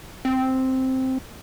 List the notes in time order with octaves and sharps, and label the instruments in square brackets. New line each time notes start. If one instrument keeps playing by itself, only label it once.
[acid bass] C4